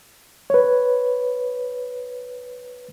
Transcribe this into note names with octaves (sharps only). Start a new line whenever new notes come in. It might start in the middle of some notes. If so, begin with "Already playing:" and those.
B4 C#5